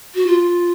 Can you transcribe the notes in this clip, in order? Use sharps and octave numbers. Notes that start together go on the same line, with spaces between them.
F#4
F4